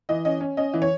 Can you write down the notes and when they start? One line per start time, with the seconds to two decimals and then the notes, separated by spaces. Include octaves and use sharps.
0.09 E3 D#5
0.25 C#4 D#5
0.41 C#4
0.57 C#4 D#5
0.74 E3
0.82 C#5